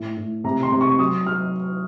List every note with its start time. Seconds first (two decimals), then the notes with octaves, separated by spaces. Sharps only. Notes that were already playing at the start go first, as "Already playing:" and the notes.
Already playing: A2
0.17 A2
0.44 C3 A#5
0.63 C6
0.72 C3
0.81 C#6
0.99 F#3 D#6
1.26 F#3 F6